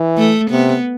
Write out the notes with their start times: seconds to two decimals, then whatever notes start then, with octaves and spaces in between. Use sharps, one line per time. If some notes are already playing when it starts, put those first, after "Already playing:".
Already playing: E3
0.17 A3
0.51 C3 B3